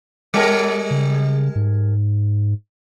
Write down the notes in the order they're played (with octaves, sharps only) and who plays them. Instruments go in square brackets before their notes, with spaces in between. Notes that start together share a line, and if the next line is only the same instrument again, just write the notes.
[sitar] G3 G#3 A#4
[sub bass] C#3
G#2